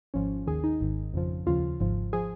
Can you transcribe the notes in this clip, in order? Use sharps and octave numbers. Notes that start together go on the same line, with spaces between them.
G#1 G#2 F3 C#4
D#2 D#3 G#4
D#4
G#1 G#2 D#3
F2 C#3 F3
D#2 C#3 F3 F4
G#1 G#2 F3
F3 G#4